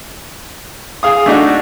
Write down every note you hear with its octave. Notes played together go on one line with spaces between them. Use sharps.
G#4 F5 D#6
A3 D4 D#4 F#4